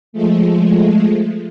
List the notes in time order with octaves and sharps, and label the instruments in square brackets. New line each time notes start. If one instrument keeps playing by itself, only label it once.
[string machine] F3 G#3 A3